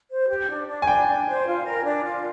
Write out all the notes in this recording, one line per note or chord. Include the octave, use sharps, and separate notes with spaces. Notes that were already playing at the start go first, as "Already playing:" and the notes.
C5
G4
D4
D4
G#5
D4 G5
D4
C5
F4
A#4
D4
F4